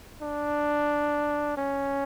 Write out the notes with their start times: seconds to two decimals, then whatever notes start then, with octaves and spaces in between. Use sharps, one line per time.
0.22 D4
1.57 C#4